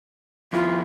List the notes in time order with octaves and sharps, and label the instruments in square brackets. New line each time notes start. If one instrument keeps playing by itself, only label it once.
[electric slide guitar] F2 E4 [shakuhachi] F4